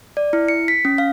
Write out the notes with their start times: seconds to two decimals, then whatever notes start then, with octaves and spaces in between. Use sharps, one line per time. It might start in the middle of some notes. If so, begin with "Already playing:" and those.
0.17 D5
0.33 E4
0.48 C#7
0.68 B6
0.85 C#4
0.98 F5